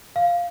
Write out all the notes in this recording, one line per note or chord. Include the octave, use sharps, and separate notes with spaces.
F5